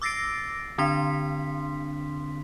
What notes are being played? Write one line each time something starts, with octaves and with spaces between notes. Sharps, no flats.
D6 E6 A6 A#6 C7 D7
D3 C4 D4 C6 B6